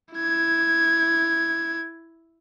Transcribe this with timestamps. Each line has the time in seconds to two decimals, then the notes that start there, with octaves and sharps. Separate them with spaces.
0.14 E4 G#6